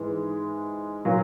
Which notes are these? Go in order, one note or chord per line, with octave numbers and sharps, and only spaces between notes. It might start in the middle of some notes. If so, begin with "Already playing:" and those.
Already playing: G#2 E3 G#3
A#2 F#3 A#3